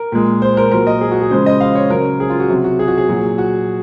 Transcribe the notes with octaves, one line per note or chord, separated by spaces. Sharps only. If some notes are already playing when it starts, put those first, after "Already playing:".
Already playing: A#4
A#2 G#3
C5
A#4
A#2 F#3 A#4
D#5
G#4
F#4
G#4
C#3 F3 G#3 C5
D#5
F5
C#5
C#3 F#3 A#4
G#4
F4
F#4
C3 F#3
F#4
G#4
F#4
G#4
A#2 F#3
F#4